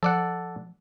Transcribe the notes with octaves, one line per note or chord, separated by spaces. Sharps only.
F3 A4 D5 F#5